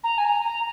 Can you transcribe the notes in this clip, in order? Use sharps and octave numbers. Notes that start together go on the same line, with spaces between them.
A#5
G#5
A#5
A#5